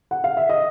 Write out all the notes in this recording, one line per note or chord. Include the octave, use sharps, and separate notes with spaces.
F#5
F5
E5
D#5